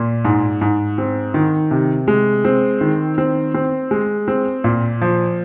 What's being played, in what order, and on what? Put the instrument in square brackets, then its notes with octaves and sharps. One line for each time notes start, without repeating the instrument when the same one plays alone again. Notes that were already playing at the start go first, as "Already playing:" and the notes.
Already playing: [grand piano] A#2
G#2
G#2
C4
D#3
C3
G#3
C4
D#3
C4
C4
G#3
C4
A#2
F3